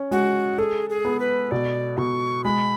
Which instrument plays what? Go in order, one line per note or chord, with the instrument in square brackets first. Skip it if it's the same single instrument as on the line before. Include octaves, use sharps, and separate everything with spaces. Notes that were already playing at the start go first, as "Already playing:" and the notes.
Already playing: [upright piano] C#4
[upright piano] G#3 [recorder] F#4
[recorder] G#4 [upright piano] A4
[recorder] G#4
[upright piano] B3
[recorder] B4
[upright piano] B2 [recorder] D5
[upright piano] B2 [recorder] C#6
[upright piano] G#3 [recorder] B5